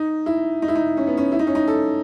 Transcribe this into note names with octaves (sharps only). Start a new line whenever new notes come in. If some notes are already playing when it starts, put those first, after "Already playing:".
Already playing: D#4
E4
D#4
E4
D#4
C#4
B3
C#4
E4
D#4
C#4
D#4
A4